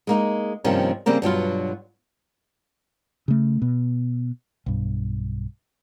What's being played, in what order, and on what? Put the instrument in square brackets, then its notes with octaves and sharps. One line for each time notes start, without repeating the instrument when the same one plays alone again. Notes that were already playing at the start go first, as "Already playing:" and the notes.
[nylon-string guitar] G#3 A#3 D#4
G2 C3 D#3 F3 A#3 C#4
C#3 G3 A#3 C4 A#4
G2 B2 F#3 F4
[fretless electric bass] C#3 A3
B2
B1 G2